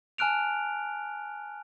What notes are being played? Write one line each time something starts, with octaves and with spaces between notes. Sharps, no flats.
G#5 A5 F6 F#6 D7 F7